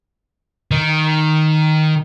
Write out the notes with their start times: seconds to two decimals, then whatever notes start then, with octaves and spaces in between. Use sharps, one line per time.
0.71 D#3